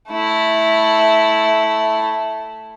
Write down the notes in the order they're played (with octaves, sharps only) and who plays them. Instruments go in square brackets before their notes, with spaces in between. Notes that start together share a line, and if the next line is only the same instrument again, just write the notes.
[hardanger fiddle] A3 E4